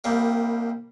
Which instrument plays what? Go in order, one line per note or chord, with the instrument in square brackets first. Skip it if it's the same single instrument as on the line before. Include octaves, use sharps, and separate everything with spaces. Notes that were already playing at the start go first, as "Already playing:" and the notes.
[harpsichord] C2 G3 A#3